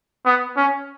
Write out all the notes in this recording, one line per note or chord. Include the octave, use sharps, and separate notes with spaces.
B3
C#4